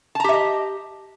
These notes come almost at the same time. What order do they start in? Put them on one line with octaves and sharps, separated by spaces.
A5 A#5 G4 E5 D#5